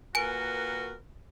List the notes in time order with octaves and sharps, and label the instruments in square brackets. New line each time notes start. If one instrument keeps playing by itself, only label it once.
[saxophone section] A#2 A#4 B4 [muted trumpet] F#4 [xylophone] G#5 D7